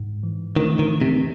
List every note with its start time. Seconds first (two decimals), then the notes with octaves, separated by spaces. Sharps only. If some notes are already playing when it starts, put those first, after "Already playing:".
Already playing: G#2
0.23 E3
0.56 D#3 A3
0.79 D#3
0.90 E3
1.01 C3